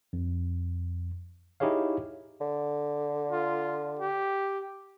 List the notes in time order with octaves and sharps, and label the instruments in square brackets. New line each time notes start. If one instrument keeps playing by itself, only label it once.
[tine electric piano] F2
D#4 E4 G4 G#4 C#5 F5
[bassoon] D3
[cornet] F4
G4